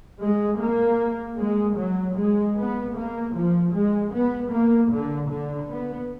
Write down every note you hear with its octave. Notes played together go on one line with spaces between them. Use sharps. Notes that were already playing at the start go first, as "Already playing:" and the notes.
G#3
A#3
G#3
F#3
G#3
B3
A#3
F3
G#3
B3
A#3
D3
D3
B3